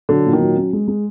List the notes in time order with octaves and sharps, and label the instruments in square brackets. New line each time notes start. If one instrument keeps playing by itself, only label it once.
[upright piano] D3 [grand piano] F#3
[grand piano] A#2
[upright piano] D#3
[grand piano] F#3
C#4
G#3
G#3